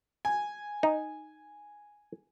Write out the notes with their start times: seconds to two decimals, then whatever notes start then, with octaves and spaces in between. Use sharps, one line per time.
0.25 G#5
0.83 D#4